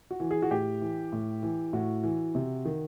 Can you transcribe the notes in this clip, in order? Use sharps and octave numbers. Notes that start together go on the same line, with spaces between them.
F#4
E3
G#4
F#4
A2 G4
E3
A2
E3
A2 F#4
E3
C3
D#3